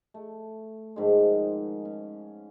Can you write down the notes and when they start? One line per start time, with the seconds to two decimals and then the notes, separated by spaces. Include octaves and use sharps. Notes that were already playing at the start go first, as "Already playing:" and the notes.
0.14 A3
0.96 G#2 D#3 F3 G#3
1.85 C#4